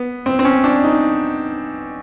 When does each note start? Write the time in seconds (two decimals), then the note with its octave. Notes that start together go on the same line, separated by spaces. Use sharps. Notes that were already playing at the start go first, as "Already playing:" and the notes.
Already playing: B3
0.26 C4
0.39 C4
0.45 C#4
0.64 D4
0.84 D#4